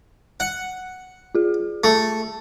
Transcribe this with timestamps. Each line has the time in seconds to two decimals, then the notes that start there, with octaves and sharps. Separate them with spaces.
0.40 F#5
1.35 F4 G#4
1.84 A3